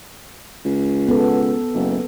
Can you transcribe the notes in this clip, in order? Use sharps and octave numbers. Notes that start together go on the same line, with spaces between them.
C#2
B3 A4
F#1